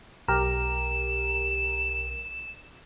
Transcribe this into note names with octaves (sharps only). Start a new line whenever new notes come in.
B1 G4 A#4 E7